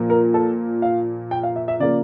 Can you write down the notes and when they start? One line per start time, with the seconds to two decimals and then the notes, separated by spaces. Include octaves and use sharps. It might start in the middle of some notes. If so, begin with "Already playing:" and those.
Already playing: A#2 F3 A#3
0.10 A#4
0.34 A4
0.82 F5
1.31 G5
1.43 F5
1.56 E5
1.68 E5
1.80 C#3 F3 A#3 D5